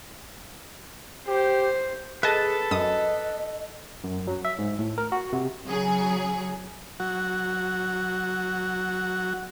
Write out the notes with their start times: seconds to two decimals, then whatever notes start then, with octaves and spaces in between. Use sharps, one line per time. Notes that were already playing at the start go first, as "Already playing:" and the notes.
1.27 G4 C5
2.23 G#4 A4 B4 D#5 A5
2.71 F#2 D#5 D#6
4.04 F#2
4.27 F#3
4.45 E5
4.58 G#2
4.79 A2
4.98 A#4
5.12 F#4
5.33 C3
5.66 C#3 F#3 G#4
7.00 F#3 F#4